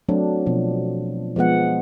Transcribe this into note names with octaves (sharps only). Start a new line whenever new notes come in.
F#3 A3 C4 D4
B2 F3
F3 G#3 B3 F#5